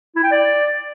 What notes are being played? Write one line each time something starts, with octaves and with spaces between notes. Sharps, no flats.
E4
G5
D5